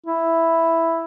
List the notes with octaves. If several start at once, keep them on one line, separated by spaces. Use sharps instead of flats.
E4